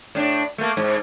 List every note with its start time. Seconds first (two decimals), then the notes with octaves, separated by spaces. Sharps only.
0.15 A2 D4
0.58 A3 A#3
0.77 G#2